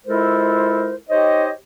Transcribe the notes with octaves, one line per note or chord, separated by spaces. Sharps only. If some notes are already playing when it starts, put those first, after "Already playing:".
G#3 E4 F4 A4 A#4 C5
D#4 G4 C5 C#5 D#5